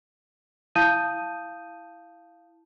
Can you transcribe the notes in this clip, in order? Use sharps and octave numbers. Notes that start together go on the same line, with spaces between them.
E4 F5 A5 D#6 G6 D#7